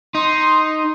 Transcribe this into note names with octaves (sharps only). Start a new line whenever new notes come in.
D#4 C6